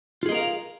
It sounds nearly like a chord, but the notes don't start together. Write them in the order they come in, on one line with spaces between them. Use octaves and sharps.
F4 G#4 D#5 A#4 F5